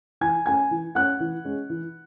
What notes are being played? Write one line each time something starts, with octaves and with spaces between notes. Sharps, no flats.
E3 G#5 G#6
A3 C#4 G#5 G#6
E3
A3 C#4 F#5 F#6
E3
G#3 C#4
E3